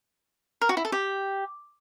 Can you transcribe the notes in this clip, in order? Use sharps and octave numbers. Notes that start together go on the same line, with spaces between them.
A#4
F#4
E4
A4
G4